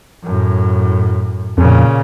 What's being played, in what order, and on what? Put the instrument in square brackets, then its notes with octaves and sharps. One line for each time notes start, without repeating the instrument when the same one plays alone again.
[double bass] F#2 A2
[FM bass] F2 [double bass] A#2 C#3